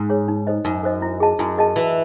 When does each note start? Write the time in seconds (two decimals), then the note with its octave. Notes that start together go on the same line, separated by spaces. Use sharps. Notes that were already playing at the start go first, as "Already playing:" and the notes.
Already playing: G#2
0.10 G#4 C#5
0.28 D#4
0.47 A4 C5 D#5
0.65 F#2 D#4
0.83 A4 C5 D#5
1.02 E4
1.20 G#4 D#5 A5
1.39 F#2 E4
1.58 G#4 D#5 A5
1.76 E3 F#4